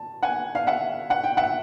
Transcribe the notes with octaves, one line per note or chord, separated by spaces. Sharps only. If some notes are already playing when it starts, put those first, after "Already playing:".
Already playing: A5
F#5 G#5
F5
E5 F#5
F#5
G5
E5 F#5